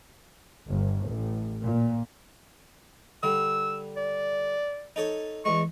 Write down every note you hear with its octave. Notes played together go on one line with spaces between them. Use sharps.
G1
A1
A#2
D3 G3 E6
D5
D#4 A4 C#5
E2 G#3 C#6